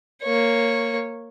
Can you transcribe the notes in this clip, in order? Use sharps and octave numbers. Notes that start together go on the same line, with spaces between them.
A#3 C#5